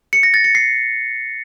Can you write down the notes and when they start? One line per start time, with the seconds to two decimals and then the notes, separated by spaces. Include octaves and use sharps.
0.13 C#7
0.23 A#6
0.34 A6
0.44 C#7
0.55 C7